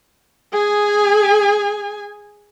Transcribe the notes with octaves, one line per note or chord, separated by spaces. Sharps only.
G#4 G#5